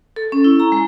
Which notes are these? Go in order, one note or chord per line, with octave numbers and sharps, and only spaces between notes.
A4
C#4
E4
A#5
G#3